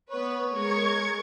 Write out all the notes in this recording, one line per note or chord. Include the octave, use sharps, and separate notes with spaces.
B3 B4 C#5
G#3 A#4 C#6 G#6